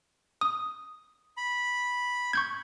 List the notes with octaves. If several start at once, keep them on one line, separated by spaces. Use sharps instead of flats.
D#6
B5
C#6 G6 G#6